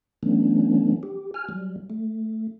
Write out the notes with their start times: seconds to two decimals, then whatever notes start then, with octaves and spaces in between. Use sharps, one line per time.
0.23 E3 F#3 A3 B3 C#4 D4
1.03 G4
1.34 G#5 F6
1.49 F#3 G3
1.90 A3